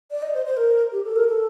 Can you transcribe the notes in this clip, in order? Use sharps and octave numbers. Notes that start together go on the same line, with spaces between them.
D5
D#5
C5
C5
A#4
G4
A4
A#4
A4